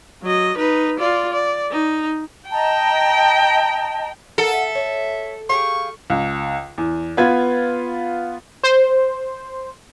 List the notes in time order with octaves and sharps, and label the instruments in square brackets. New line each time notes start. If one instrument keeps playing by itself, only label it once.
[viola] F#3 D#5
D#4 B4
F4 D5
D5
D#4
[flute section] D#5 A5 A#5 [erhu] G5
[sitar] A4 [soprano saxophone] A#4 [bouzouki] D#5 F5 F#5
[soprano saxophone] E5
[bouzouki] C#5
[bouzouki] G4 G#4 F5 [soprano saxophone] C#6
[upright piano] C#2
E2
B3 F4 B4 G#6
[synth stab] C5